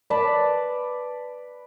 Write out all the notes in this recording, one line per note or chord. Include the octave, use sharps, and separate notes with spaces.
B4 D5 A5 B5